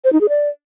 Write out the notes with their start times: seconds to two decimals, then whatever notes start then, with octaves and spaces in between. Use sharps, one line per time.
0.04 C5
0.13 D#4
0.21 G#4
0.29 D5